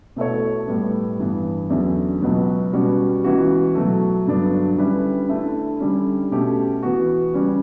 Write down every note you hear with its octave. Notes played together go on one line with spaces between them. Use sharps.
B2 A3 E4 A4 C#5
A2 G3 B3
G2 E3 B3
E2 D3 F#3 C#4 E4
C#2 B2 F#3 B3
B2 G3 C#4 F#4 B4
C#2 C#3 E3 B3 F#4
B2 F#3 A3
G2 D3 F#3 B3 D4
D3 G3 C#4 E4 B4
D2 D3 A3 E4
D3 G3 C#4
B2 A3 C#4 G4
E3 B3 F#4
C#3 G3 C#4